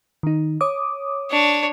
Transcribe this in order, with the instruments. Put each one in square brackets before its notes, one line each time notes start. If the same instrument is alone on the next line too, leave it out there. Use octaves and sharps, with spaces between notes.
[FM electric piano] D#3 D#4
C#5 D6 D#6
[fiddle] D4 C#5